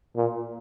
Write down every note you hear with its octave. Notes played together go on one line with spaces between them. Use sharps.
A#2